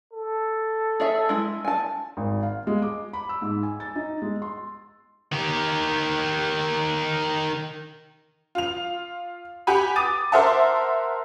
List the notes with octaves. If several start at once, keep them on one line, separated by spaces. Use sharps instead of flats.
A4
G#4 C#5 E5
G#3 E4
G#5 A5
G#1
F5
G#3
D6
B5
E6
G#2
G#5
A6
D#4
G#3
C6
D#3 G4
F4 F7
G4 F#5 G#5 B5
D6 D#6 A6 D#7
A#4 C5 E5 F#5 A5